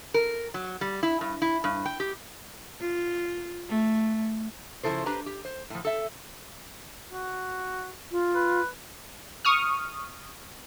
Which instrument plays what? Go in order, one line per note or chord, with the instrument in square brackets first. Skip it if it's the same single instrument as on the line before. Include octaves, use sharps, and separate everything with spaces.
[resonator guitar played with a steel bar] A#4
F#3
G3
E4
G2
E4
G2
G5
G4
[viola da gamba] F4
A3
[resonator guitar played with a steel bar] C#3 F3 G3 E4 A4 C5
D4 G4 B4 C5 A#5
G4
C5
A2 F3
A4 E5
[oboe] F#4
[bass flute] F4
[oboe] B4
[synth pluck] C#6 D#6 F6